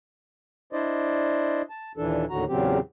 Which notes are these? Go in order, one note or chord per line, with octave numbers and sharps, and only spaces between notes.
D4 E4 C5 D5 D#5
A5
D#2 A#2 E3 D4 A4
D#2 A2 D3 F#4 A#5
E2 A#2 C#3 F#3 C4 G4